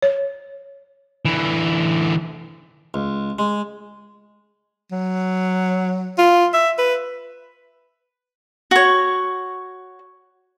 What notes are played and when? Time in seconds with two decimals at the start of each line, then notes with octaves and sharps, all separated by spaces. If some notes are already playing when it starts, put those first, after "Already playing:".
0.02 C#5
1.25 D3 E3
2.94 C#2
3.39 G#3
4.92 F#3
6.18 F4
6.54 E5
6.78 B4
8.71 F#4 C#5